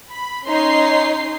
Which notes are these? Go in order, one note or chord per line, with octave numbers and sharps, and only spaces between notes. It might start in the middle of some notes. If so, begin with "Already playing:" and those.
B5
C#4 D#4 C#5 D#5 C6 C7